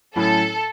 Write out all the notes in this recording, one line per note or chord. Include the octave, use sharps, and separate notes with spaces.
A2 F#3 C#4 E4 A4